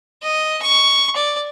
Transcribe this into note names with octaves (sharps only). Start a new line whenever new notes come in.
D#5
C#6
D5